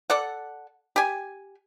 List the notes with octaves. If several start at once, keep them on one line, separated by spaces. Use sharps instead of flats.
A4 D5 F#5
G4 G#5